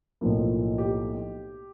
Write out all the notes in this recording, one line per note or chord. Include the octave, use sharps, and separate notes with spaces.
B1 A2 F3 A#3
G4